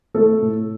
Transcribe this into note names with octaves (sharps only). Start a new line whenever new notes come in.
A3 A4
A2